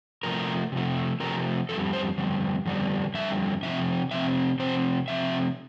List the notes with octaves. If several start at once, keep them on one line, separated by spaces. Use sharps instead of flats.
C3 F3 A3 A#4
C3 F3 A3
C3 F3 A3 A#4
F2 D3 G3 A4
C5
F2 D3 G3
F2 D3 G3
F2 D3 G3 E5
C3 F3 C4 E5
C3 F3 C4 E5
C3 F3 C4 C5
C3 F3 C4 E5